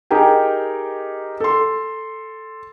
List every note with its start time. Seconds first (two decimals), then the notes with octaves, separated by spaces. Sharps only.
0.11 D#4 G4 G#4 A#4 G5
1.40 A4 C6